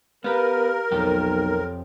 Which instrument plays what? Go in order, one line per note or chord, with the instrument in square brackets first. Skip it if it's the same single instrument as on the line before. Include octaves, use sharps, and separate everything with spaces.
[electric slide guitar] B3 B4 [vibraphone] G4 F5 [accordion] A#4
[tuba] B1 [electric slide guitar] F2 G4 [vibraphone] A4 C#5